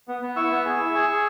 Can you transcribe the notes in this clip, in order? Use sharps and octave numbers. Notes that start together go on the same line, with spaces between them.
B3
B3
E4 C#6 E6
B3
G#4
E4
G#4
G#4